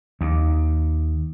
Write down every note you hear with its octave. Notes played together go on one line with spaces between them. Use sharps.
D#2